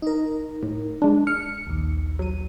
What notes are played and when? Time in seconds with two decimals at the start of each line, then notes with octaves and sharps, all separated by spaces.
0.02 D#4 A#4
0.63 A2
1.02 G#3 D4
1.27 F6 C#7
1.67 A#1 D#2
2.19 F#3 D#7